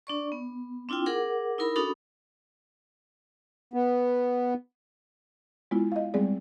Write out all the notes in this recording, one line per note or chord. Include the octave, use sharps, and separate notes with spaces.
D4 D5 C#6
B3
C4 D4 E4 F4 G5
G#4 A#4 F#5 D6
D#4 E4 A#4 B5
C#4 D4 F#4 A4 B5 D#6
B3
G#3 B3 E4 F4
D#5 F5
G3 G#3 B3 C4 G#4 D5